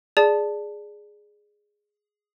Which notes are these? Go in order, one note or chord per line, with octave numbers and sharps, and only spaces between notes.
G#4 D5 A5